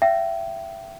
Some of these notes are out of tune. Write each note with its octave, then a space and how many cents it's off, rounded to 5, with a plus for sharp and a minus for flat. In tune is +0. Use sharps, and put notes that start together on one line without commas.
E5 +30 G5 -25